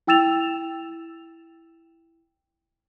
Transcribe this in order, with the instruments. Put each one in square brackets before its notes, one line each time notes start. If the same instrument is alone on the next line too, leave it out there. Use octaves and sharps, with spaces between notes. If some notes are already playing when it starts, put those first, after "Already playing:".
[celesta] E4 G5 E6 A6 E7 F7